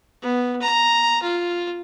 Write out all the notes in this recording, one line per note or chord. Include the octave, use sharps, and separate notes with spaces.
B3
A#5
F4